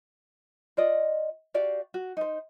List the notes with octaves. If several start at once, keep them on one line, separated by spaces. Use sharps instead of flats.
F4 D5 D#5
F#4 G4 D5 F5
F#4
D#4 C5